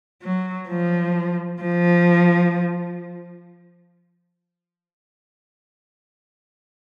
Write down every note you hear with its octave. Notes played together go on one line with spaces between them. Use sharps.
F#3
F3
F3